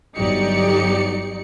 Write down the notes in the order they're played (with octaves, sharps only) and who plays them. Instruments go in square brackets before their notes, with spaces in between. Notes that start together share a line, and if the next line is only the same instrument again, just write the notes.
[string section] G1 F#3 D#4 G4 D5 C#7